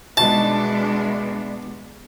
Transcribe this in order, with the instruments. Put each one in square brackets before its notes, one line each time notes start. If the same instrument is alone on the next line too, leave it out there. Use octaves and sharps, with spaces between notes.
[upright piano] C2 B2 D#4 [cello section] G#3 B3 D4 [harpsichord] A5